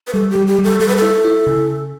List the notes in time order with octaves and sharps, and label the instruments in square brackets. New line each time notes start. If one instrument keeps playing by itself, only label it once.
[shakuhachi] B4
[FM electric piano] G3 [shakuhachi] A4
[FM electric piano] G3 [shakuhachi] G4
[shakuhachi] G4
[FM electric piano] G3
[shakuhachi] A4
[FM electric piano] G3 [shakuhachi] A4
[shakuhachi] B4
A4
[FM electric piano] E4
E4
C#3